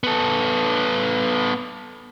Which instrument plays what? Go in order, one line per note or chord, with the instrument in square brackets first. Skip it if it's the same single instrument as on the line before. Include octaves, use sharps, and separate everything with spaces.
[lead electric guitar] B3 A4